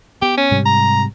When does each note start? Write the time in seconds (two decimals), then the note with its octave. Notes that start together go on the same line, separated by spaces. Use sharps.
0.22 B3 G4
0.37 C#4
0.51 G#2 C3 G3
0.66 A#5